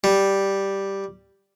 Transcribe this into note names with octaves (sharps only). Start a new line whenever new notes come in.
G3